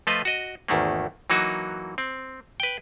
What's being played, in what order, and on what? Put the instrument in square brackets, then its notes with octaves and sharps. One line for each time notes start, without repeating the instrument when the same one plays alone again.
[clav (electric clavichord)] F3 A3 F4 B4 D#5
F#4 D#5
G#1 E2 D#3 A3 A#3
E3 F#3 A#3 D#4 F#4
C4
B4 G5